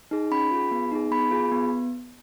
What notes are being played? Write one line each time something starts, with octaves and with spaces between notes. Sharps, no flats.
D#4 G#4
C#4 B5
F4 G#4
B3
D#4 G#4
B3 B5
F4 G#4
B3